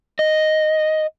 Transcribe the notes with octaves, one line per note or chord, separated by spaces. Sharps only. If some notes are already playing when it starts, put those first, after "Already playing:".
D#5